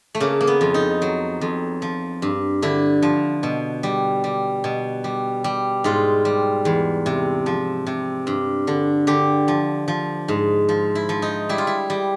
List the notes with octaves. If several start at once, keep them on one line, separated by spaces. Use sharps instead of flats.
A3
C#3 A#3
A#3
B3
F2
D#4
F#3
F2
F3
G2
D3 E4
F3
B2
G3
G3
B2
G3
G3
G#2 F4
G3
E2
C3
F3
C3
G2
D3
D3 G4
F3
F3
G#2
F3
E4
F3
D#4
G3 E4
F4
E4
G3